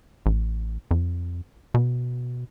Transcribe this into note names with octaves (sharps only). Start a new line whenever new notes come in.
A1
F2
B2